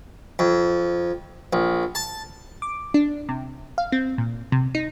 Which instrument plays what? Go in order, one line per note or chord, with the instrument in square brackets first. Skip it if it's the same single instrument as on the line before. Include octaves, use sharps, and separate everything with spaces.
[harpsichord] F2
A#1
A5
[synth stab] D6
D4
C3
F5
C4
A#2
C3
D#4